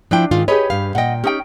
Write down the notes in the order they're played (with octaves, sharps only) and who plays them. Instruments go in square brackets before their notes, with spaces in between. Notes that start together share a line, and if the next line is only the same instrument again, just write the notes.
[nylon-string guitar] F3 E4 G5 [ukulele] D4
[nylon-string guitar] G#2 D#3 F4
[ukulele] G4 G#4 B4 [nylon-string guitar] C#5 D#5
[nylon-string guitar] G2 F5
[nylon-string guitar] A#2 G5 [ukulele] D#5 F#5
[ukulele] C#4 D#4 G5 [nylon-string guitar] G4